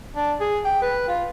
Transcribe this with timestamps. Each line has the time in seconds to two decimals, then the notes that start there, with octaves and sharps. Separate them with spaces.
0.16 D4
0.41 G#4
0.65 G5
0.82 B4
1.08 F4